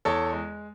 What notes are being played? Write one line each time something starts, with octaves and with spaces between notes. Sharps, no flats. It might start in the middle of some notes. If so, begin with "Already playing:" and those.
E2 A4 C#5
G#3